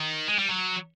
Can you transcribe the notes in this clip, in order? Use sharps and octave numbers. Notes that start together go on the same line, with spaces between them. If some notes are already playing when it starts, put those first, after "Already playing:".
Already playing: D#3
G#3
G3
F#3